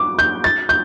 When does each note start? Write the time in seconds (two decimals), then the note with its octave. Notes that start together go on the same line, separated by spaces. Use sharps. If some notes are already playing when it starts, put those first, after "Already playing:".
Already playing: D6
0.19 G6
0.44 A6
0.69 G6